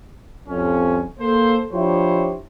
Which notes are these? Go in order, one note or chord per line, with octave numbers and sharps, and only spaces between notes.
C2 F2 C#4
A#3 A4 C5
F3 D4 E4 G4 C5 C#5